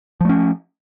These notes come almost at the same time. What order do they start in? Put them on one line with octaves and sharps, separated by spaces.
F3 A3 C#4